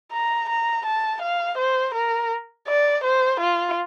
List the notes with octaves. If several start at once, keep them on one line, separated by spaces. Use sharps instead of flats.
A#5
A#5
A5
F5
C5
A#4
D5
C5
F4